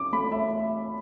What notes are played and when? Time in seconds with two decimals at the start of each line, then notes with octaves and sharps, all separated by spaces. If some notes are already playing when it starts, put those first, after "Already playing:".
Already playing: C#4 D6
0.13 A3 B5
0.32 E5